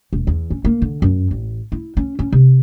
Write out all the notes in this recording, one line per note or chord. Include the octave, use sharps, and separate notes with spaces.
E1
E2
C#4
A#3
D3
F#2
A1
E4
C#4
C#4
C3